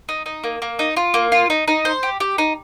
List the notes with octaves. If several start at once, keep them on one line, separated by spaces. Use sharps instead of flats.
D#4
D#4
A#3
A#3
D#4
F4
A#3
F4
D#4
D#4
C5
G4
G4
D#4